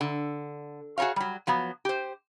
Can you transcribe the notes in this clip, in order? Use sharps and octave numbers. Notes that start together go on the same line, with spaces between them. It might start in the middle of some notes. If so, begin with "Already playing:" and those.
D3
F#4 G#4 A#4 C#5 F5
F#3 G3
F3 F#3 B3
G4 C5